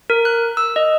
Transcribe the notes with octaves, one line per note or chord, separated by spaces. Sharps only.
A#4
F#6
E6
D#5